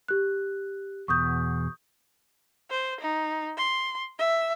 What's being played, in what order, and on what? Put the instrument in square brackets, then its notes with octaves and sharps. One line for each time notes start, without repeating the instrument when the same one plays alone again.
[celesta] G4 F#6
[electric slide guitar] E2 B2 [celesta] C#6 D#6 G6
[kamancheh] C5
D#4
C6
E5